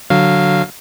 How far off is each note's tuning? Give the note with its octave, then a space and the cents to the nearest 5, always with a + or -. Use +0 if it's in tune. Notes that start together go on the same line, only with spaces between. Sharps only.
D3 +0 F#3 +0 F5 +0